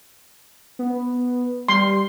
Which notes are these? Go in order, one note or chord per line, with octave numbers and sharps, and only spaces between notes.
B3
G3 C6